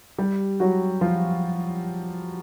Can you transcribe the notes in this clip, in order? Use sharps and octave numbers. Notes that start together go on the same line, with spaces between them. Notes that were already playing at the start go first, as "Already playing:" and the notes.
G3 G4
F#3 F#4
F3 F4